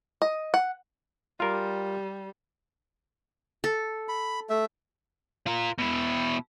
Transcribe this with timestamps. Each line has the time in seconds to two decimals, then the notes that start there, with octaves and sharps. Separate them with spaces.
0.22 D#5
0.54 F#5
1.40 G3 F4 A#4
3.64 A4
4.08 B5
4.50 A3 E5
5.46 F4 A#4
5.79 B2 E4